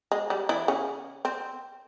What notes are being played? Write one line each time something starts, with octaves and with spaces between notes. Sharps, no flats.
G#3
G3
E3 E4
C#3 C#4
C4